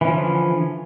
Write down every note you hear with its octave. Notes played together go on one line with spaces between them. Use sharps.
D3 E3 F3 C#4